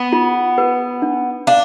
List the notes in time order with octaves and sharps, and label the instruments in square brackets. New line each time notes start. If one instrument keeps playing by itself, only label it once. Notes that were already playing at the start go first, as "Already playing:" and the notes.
Already playing: [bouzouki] B3
[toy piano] F4
B4
D4
[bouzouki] D4 [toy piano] F5